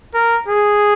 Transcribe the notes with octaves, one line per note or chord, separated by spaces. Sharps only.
A#4
G#4